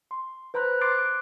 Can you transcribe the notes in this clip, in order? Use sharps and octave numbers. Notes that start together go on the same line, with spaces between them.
C6
B4 C5 A#5 B5 F#6
C6 D6 F#6 A6 C7 D7